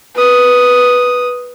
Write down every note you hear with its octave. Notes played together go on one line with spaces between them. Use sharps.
B4 D#6